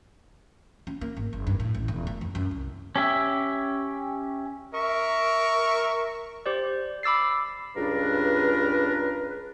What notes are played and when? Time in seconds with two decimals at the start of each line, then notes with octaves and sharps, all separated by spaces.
0.87 C#4
1.01 A#3
1.17 G#1
1.33 F#1
1.47 G2
1.60 A2
1.75 A1
1.88 E1
2.07 A3
2.21 F2
2.35 F#2
2.51 C2
2.96 C#4 G4 E5
4.74 A#4 E5 C#6
6.46 G4 C5 D5
7.03 B5 D6 E6 A6 C7
7.75 C#2 G2 D4 A#4 B4